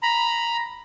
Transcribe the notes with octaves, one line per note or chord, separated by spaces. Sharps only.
A#5 B5